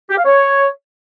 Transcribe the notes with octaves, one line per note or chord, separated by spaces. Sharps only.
G4
F5
C#5